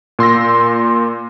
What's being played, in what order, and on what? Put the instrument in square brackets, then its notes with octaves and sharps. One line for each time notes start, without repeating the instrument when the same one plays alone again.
[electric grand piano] A#2 C6 E6 A#6